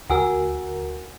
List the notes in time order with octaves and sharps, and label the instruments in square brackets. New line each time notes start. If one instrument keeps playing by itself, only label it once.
[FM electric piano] D2 F#4 A#4 [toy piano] F#5 G#5 E6